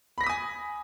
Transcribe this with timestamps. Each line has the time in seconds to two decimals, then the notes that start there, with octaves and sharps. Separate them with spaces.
0.18 B5
0.21 A#6
0.24 B6
0.27 D#6
0.29 G#5